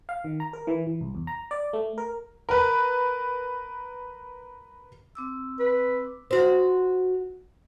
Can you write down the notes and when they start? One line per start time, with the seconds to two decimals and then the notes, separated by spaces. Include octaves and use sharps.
0.09 F5
0.24 D#3
0.40 A#5
0.53 A#4
0.67 E3
0.87 E3
1.01 C2
1.15 E2
1.27 A#5
1.51 D5
1.73 A3
1.98 A#4
2.49 A#4 B4
5.15 C4 D6 E6
5.60 B4
6.31 F#4 C5